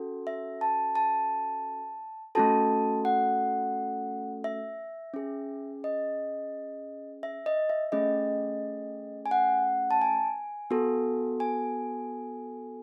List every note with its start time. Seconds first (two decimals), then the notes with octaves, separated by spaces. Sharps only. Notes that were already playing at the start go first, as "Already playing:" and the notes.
Already playing: C#4 F#4 A4
0.27 E5
0.61 A5
0.95 A5
2.35 A3 C#4 F#4 A4 A5
3.05 F#5
4.44 E5
5.14 C#4 G#4
5.84 D#5
7.23 E5
7.46 D#5
7.70 E5
7.92 A3 C#4 G#4 D#5
9.26 G#5
9.31 F#5
9.91 A5
10.02 G#5
10.71 B3 F#4 A4
11.40 G#5